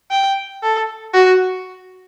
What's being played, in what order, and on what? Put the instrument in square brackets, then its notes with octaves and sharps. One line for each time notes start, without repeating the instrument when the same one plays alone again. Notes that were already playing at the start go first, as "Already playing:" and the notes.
[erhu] G5
A4
F#4